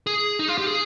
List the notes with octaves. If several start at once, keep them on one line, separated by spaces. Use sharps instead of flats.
G#4
D#4
F4
G4
G#4